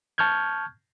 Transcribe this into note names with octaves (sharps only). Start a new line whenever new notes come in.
A5 C#6 F6 G6 G#6